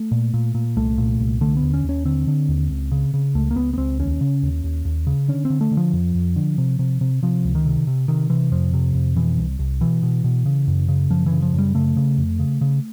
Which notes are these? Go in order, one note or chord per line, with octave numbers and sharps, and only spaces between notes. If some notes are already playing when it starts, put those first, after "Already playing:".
Already playing: A3
A#2
A#2
A#2
C2 A3
A#2
C2
D3 A3
B3
D#2
C#4
D#2
C#4
D3 C4
D3
D#2
C#2
C#3
C#3
C#2 A3
A#3
C#2 B3
B3
C#2 C4
D#2 C#4
C#3
D#2
D#2
D#2
C#3
D3 C#4
C4
D3
A3
D3
F3
F2
F2
D3
C3
C3
C3
C3 F3
C#2
D#3
C3
C3
C3 D#3
C3 E3
F2 F3
C3
F2
B2 E3
C2
C2
B2 E3
B2
B2
C#3
F#2
C#3
F#2 F3
E3
C#3
F3
F#2
G3
C#3 A3
C#3
F2
C#3
C#3